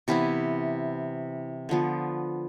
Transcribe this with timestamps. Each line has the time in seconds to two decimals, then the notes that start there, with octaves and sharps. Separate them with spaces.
0.08 C3 E3 B3 E4
1.69 D3 F3 B3